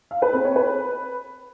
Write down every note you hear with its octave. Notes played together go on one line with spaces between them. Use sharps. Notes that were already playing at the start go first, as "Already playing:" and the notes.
F5
B4
C4
C#5
B4